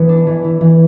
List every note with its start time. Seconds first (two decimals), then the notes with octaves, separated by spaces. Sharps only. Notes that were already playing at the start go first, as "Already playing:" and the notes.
Already playing: E3 B3
0.09 D4
0.27 E3
0.44 E3
0.61 E3